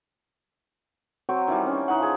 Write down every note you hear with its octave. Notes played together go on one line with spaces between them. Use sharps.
F#3 C4 G5 C#6
D#3 E3 G3
C#4
E3 D#4 F#5
F3 G#4